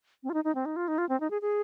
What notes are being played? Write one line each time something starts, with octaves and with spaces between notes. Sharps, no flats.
C4
F4
D#4
D#4
C4
D#4
F4
D#4
F4
C4
D#4
G#4
G#4